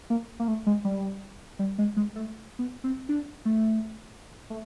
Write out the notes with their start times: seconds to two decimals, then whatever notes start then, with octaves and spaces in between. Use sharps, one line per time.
0.10 A#3
0.39 A#3
0.48 A3
0.66 G#3
0.85 G3
1.59 G3
1.78 G#3
1.97 G#3
2.16 A3
2.59 B3
2.84 C4
3.09 D4
3.45 A3
4.50 A3